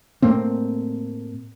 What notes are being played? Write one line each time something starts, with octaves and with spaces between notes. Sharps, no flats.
A2 A3 A#3 C4